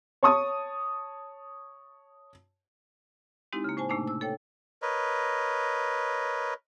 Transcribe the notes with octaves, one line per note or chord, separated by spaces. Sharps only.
C#5 A5 C#6 D#6
G#3 C4 D#4 E4 G4
C#3 A#3
A2 C5 G#5 A5
A2 C3 A3 A#3 D4 D#4
E6
A4 C#5 G5
A#4 B4 C#5 D#5